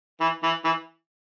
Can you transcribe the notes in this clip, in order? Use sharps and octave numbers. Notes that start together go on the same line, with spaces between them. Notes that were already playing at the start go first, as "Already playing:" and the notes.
E3
E3
E3